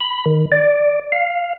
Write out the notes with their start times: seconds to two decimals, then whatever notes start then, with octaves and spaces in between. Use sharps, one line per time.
0.01 B5
0.26 D#3
0.52 D5
1.12 F5